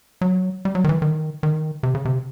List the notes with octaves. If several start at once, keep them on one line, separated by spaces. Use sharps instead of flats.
F#3
G3
F#3
D#3
E3
D#3
D#3
C3
C#3
C3